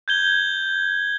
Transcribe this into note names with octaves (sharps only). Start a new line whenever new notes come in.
G6 G#6 G7